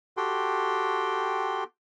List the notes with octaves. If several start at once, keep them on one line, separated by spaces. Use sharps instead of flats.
F#4 G4 A4 G5 C6